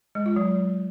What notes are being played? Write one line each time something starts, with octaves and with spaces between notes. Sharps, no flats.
G#3
F4
F#3